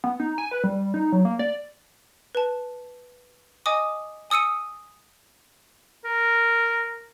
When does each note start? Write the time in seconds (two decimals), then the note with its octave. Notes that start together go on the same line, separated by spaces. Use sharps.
0.04 B3
0.20 D#4
0.38 G#5
0.51 B4
0.64 G3
0.94 D#4
1.12 F#3
1.25 A#3
1.39 D5
2.35 B4 A5
3.66 D#5 G#5 D6 D#6
4.30 G#5 D#6 E6 C#7 D#7
6.05 A#4